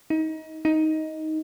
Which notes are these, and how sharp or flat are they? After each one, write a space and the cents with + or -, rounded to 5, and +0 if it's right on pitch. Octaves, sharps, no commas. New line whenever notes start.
D#4 +25
D#4 +10